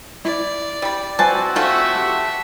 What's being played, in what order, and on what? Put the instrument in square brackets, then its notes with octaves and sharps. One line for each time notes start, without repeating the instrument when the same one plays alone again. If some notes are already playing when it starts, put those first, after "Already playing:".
[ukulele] E4 [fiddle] D5
[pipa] G3 B5
[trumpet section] C4 E4 F#4 [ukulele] B4 C5 G#5 [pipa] A5
[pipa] F3 A3 F4 [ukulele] A4 [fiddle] E5 F#5
[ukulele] G4